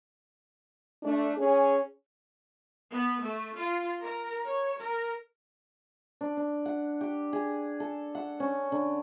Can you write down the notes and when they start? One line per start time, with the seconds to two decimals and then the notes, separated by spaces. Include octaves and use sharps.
1.03 A3 D4
1.37 C#4 G#4
2.92 B3
3.23 A3
3.56 F4
4.01 A#4
4.47 C#5
4.79 A#4
6.21 D4
6.37 D4
6.66 F#5
7.01 G4
7.33 G#4
7.80 A4
8.15 F#5
8.40 C#4
8.72 D3